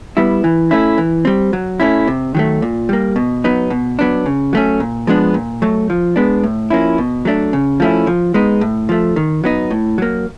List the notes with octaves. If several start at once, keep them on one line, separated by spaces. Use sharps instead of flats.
G3 B3 E4
E3
A3 C#4 E4
E3
G3 C4
F#3
A3 C#4 E4
C3
D#3 F#3 A3
A#2
G3 A#3
B2
F#3 B3 D#4
B2
F#3 B3 D4
C#3
F#3 A3 C#4
A#2
F3 G#3 B3 D4
A#2
F#3 A3
F3
G#3 B3 D4
A2
F3 A#3 C#4 E4
B2
F#3 A3 D4
C#3
F3 A3 C#4 E4
F3
G#3 B3 D#4
A2
F3 A3
D#3
F#3 B3 D#4
A2
F#3 A#3